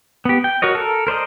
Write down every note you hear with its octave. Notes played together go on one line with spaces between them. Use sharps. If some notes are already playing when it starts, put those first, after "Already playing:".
B3 G4
G5
F#4 A#4 C#5 D#5
A4 A#4
A#4 C5 D5 D#5